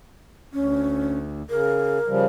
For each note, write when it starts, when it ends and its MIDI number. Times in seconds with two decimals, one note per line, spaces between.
0.53 1.42 38
0.53 1.17 61
1.50 1.98 49
1.50 2.25 70
2.08 2.26 49
2.08 2.26 53
2.08 2.26 55